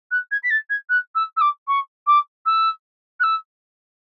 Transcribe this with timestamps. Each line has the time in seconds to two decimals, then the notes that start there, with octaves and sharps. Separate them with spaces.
0.11 F#6
0.31 G#6
0.43 B6
0.50 A6
0.69 G#6
0.89 F#6
1.15 E6
1.36 E6
1.41 D6
1.67 C#6
2.07 D6
2.46 E6
3.20 F#6
3.23 E6